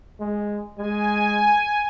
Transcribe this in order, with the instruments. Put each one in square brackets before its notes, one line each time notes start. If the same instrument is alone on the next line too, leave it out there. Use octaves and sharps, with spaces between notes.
[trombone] G#3
[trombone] G#3 [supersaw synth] G#5